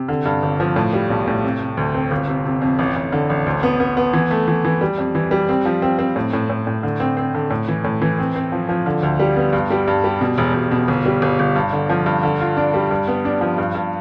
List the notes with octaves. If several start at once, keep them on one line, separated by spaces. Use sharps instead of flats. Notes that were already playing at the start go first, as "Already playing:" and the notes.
Already playing: C3
D3
G2
G1
F3
A2
G3
B1
A2
C3
C3
D2
C4
G1
C3
C3
F2
A1
A1
D3
A1
D2
B3
B3
B3
E3
A3
E3
E3
G3
F2
E3
G3
C4
F3
C4
C4
A2
A2
A2
A2
D3
C4
C4
D3
A2
E3
A2
E3
C4
C4
F3
F3
D3
D2
G3
B3
G2
G3
G2
G3
B2
E1
E1
B2
G1
G3
G1
G1
G2
D3
F3
G2
D3
F4
D4
G3
G2
B3
D4
F3
G2
G2